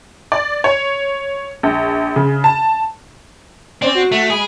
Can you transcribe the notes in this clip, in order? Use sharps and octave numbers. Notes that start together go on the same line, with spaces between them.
D5
C#5
A#1
C#3
A5
C4 C#4 C5 D5
F#4
A3
G#3 G#4 B5 D7